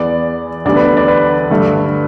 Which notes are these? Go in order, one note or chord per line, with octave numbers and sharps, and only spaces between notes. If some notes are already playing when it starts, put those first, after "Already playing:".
Already playing: E2 E3 B3 D5
D2 D3 G3 B3 D5
B4
D5
B4
G2 D3 A3